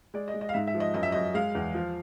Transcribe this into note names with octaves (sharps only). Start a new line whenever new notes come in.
G#3 D5
D#5
G#3
D#5
F5
G#2 E5
E5
F3
D#5
F#2 D#5
E5
F#2 D#5
G#3 F5
E2
F3